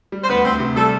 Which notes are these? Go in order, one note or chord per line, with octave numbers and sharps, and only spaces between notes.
G3
C5
D2 B3 B4
D2 C4 C5
C3
G3 A3 A4